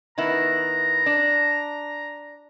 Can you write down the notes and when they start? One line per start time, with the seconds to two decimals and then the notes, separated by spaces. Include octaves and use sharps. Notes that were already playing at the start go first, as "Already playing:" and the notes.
0.18 D#3 B3 E4 A#5
1.06 D4